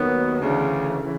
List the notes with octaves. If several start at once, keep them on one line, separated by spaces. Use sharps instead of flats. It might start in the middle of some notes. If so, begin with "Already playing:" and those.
Already playing: D#2 D#3 F#3 B3
D2 C#3 E3 A3 D4
C#3 E3